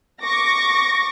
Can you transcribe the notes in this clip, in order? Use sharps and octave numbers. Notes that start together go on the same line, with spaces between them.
C#6 D6 A#6